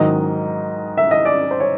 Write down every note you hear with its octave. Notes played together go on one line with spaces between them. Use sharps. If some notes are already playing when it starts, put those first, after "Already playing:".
Already playing: G#2 D#3 F#3 D#5
E5
D#5
D5
C5
C#5